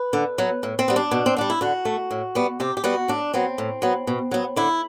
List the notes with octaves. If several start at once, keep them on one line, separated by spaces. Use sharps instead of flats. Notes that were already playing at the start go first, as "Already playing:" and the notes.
Already playing: B4
D3
F#3 B3
A2
C4
G3 B3
D4
B2
C4
G3 B3 D4
E4
D3 F#4
A3
A2
G3 B3
C3 G4
G4
G3 B3 F#4
A2 D4
F#3 B3 C4
A2
F#3 B3
B2
F#3 B3
D3 E4